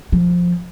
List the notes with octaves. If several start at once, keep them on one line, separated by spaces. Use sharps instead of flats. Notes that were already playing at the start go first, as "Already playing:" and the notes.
F3